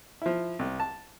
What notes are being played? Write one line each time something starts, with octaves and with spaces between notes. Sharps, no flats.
F3 E4
C2
A5